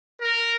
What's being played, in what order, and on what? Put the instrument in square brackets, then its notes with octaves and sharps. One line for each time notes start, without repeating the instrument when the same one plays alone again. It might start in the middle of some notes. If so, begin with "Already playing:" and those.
[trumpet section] A#4